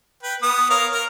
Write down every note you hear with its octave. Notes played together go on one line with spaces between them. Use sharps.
B4 G5
B3 D#6
A#4 C#5 F5
A#4